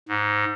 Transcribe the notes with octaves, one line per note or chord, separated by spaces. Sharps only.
G#2